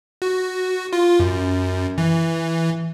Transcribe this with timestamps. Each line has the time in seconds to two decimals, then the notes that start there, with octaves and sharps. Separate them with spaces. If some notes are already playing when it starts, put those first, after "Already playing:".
0.22 F#4
0.93 F4
1.20 F#2
1.98 E3